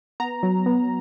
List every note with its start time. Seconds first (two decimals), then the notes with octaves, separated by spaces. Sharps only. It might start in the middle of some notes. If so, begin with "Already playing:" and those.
0.20 B3 A#5
0.43 F#3
0.66 B3